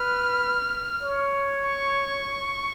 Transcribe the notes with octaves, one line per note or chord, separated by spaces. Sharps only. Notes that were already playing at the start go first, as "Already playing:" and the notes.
Already playing: B4 F6
C#5
C#6